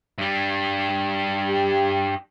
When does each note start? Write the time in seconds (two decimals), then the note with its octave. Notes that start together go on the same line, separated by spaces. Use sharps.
0.18 G2 G3
1.45 G4